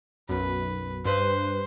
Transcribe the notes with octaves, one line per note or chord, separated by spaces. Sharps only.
B1 F#2 B4
G2 B4 C5